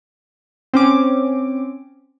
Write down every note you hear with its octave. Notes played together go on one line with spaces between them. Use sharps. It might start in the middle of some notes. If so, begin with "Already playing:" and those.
C4 C#4 D6